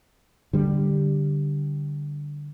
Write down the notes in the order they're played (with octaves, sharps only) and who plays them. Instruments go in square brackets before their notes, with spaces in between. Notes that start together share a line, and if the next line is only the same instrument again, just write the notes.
[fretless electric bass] D3 G3